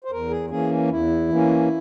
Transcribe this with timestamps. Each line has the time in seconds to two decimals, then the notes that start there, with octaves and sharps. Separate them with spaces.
0.04 C5
0.11 E2 A#4
0.30 G#4
0.50 E3 A#3 C#4 G#4
0.90 E2 E4
1.29 E3 A#3 C#4